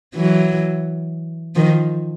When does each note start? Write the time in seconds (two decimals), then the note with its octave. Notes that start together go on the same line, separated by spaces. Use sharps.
0.15 E3 F#3
1.55 D#3 F3